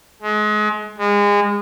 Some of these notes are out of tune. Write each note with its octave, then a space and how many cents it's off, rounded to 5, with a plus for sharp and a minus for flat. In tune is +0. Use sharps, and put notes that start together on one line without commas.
G#3 +30
G#3 -30